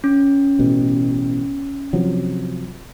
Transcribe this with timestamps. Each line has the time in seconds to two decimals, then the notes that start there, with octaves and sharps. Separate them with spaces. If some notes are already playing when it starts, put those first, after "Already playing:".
0.04 C#4
0.59 A1 B2
1.93 C3 F3 F#3